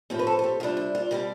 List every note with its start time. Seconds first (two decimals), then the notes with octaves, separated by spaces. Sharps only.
0.10 A2 F3 C4 G4
0.19 B4
0.27 A4
0.39 A4
0.44 G4
0.60 C3 G3 D4 F4
0.77 E4
0.95 F4
1.11 B2 G3 C4 G4